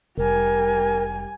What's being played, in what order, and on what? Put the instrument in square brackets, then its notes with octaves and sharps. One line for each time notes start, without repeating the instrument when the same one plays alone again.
[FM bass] F1 [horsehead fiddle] G3 G#5 [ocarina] A#4